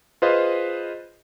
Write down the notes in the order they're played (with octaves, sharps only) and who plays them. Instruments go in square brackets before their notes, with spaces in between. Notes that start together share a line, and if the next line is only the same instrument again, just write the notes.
[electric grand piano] F4 G#4 B4 C5 D#5 F5